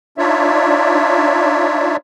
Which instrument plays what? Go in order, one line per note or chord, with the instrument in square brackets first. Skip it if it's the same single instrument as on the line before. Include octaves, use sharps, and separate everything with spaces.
[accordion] D4 D#4 F4 C#5 D5 E5